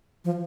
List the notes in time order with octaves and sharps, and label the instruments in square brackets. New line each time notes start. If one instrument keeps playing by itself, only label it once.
[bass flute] F3